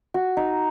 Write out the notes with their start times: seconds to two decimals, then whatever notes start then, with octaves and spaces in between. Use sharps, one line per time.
0.14 F#4
0.37 D#4